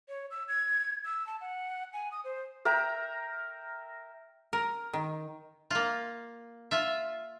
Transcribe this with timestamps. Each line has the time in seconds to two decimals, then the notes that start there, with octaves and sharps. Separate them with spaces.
0.09 C#5
0.31 E6
0.48 G#6
1.05 E6
1.27 A5
1.41 F#5
1.93 G#5
2.12 D#6
2.24 C5
2.65 A#4 E5 G5 A#5
4.53 A#4
4.93 D#3
5.71 A#3 F4
6.71 F4 E5